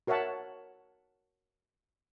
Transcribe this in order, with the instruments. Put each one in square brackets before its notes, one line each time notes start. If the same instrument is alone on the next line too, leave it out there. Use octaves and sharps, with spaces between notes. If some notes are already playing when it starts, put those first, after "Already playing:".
[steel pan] F#4 A#4 C#5 E5 F#5 A5